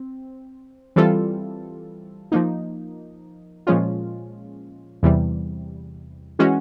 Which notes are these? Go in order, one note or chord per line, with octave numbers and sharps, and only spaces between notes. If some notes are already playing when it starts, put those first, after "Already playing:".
Already playing: C4
E3 G3 C4 F4 A4
F3 A#3 D#4
A#2 F3 G#3 C#4 F4
E2 C3 E3 G3
E3 G#3 C#4 F#4